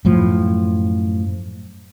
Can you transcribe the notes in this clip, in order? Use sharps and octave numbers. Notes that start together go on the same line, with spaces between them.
F#2 A2 F3